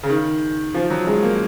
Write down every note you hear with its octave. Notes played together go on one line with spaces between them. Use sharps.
C#3
D#3
F3
F#3
G#3
A#3